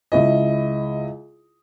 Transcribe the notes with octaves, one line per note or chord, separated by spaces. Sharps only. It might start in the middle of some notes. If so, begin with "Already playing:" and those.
C#2 E4 D#5